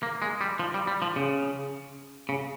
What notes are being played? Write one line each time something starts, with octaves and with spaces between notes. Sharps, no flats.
A#3
G#3
G3
F3
G3
G3
F3
C#3
C#3